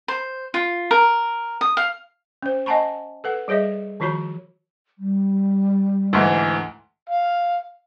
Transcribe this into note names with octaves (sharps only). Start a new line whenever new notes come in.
C5
F4
A#4
D#6
F5
C#4 C5
D#5 F#5 G#5 A5 B5 C#6
A4 B4 F#5
G3 G#4 C#5 D#5 E5
D#3 F3 F4 F#4 C#5 B5
G3
D2 G#2 E3
F5